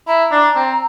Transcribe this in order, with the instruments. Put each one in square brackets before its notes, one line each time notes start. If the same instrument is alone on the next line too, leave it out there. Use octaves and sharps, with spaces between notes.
[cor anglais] E4 [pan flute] A#5
[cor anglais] D4
C4